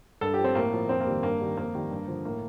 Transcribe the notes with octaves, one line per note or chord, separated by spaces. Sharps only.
G2 A4
F3 G4
C4
A2 A#3
F3
F2 C4
A#3
D#3 G3
G2 A#3
D#3 G3
F2 A#3
D#3 G3
G2
D3 F3
A2 A#3